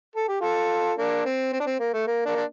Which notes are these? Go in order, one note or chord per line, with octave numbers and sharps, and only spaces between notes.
A4
G4
F4 A4
A#3 D4
C4
C4
D4
C4
A#3
A3
A#3
A#3 D4
D4